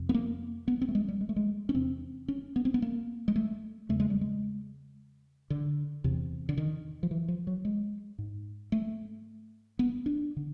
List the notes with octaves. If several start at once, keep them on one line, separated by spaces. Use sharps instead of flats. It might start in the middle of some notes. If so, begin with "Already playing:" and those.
Already playing: F2 C3
B3
A#3
B3
C4
A3
G#3
G3
G#3
A3
G#3
C#4
E2 C3 C4
C#4
B3
C4
B3
A#3
G#3
A3
E2 C#3 A3
G#3
G3
G#3
D3
E2 C3
D3
D#3
F3
E3
F3
F#3
G#3
G#2
A3
B3
D4
D3